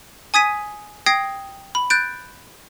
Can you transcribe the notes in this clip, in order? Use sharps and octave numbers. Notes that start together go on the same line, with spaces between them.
G#5 D#6 G#6 B6 D#7
G5 D#6 G#6 A#6 C7
B5
F#6 G6 A6 D7